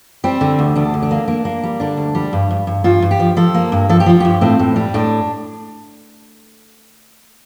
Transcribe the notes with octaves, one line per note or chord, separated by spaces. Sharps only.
G3 C4
D3
D2
D2 D4
D3
D4
A#3
A#3 D4
A#3
G3
D3 D4
D2
G3
G2
G2
G2
G2 F4
G2
G4
F3
F3 A4
A#3
G2
F3 A4
G4
F3 F4
G2 G4
A2 C4
A2
G3
A2 D4